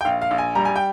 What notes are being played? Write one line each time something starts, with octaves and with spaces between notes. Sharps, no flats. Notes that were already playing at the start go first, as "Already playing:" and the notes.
G5
A#1 F5
F5
A#1
G#5
G3 A#5
G#5
G5